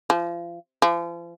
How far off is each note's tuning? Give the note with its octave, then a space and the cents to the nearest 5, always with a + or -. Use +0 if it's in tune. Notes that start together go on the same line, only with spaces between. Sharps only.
F3 -30
F3 -40